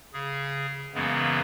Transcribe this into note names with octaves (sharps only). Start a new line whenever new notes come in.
C#3 G#4
F#2 C#3 E3 G#3 A#3 B3